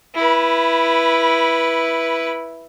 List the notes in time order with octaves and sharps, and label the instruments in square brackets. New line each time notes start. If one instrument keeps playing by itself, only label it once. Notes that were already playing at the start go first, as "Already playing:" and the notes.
[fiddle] E4 B4